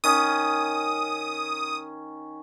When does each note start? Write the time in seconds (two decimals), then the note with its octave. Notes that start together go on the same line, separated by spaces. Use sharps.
0.04 D#3 C#4 D#6